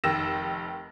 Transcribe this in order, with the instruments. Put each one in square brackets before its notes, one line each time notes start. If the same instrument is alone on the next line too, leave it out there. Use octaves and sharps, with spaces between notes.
[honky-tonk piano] F1 D#3 G4 E6 A#6 E7